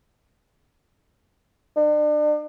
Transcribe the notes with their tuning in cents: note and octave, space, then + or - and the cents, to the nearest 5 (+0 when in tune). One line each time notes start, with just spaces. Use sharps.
D4 +40